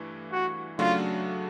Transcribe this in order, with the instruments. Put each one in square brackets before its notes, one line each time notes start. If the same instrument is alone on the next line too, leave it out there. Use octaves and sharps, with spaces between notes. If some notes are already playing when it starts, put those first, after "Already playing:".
Already playing: [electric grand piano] G2 E3 A3
[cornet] F#4
[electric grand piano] C#3 F#3 A3 D4 F#4 [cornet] F4